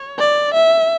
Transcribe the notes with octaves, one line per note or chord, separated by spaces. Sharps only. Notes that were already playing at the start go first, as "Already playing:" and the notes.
Already playing: C#5
D5
E5